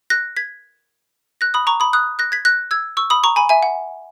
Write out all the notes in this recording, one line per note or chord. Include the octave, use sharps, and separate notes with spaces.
F#6 A#6
G#6 B6
F#6 A#6
B5 D#6
A#5 C#6
B5 D#6
D#6 F#6
F#6 A#6
G#6 B6
F#6 A#6
E6 G#6
C#6 E6
B5 D#6
A#5 C#6
G#5 B5
E5 G#5
F#5